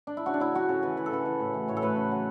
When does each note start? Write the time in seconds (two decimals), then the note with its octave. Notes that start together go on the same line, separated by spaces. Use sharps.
0.07 D4
0.17 E4
0.26 C#3 F#4
0.34 D4
0.40 C#3 E4
0.54 F#3 F#4
0.69 C#3 A4
0.83 E3 B4
0.97 E3 B4
1.06 A4
1.12 C#3 B4
1.26 E3
1.40 A2
1.54 E3
1.68 A2 C#5
1.77 A4
1.82 A2 B4
1.96 C#3
2.11 F#3